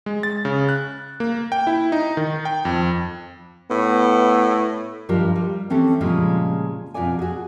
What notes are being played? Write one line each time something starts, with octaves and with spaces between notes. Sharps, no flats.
G#3
A6
C#3
F#6
A#3
G5
E4
D#4
D#3
G5
F2
A2 B3
G2 D#3 F3 G4 A#4 D5
G3
E3 C4 C#4 G4 A4
A#2 C#3 F3 G3 G#3
F2 B2 F4 A#4 D5 G#5
F#4 G#4